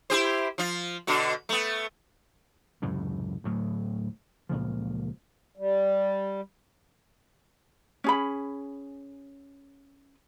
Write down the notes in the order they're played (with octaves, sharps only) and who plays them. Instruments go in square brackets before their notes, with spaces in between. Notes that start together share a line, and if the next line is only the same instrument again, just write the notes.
[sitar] E4 G4 C5
F3 F4
B2 D3 F#4
A3 B3
[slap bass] C#2 F#2 A2 C3
D2 A2 F#3
C#2 A#2 C#3 F3
[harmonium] G3
[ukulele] C#4 G#4 B5